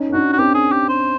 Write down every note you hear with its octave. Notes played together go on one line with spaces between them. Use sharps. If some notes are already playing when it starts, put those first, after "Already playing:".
Already playing: C#4 D#4
D4
C#4 D#4 F#4
F#4
C4 D4 G4
G#4
G4
C5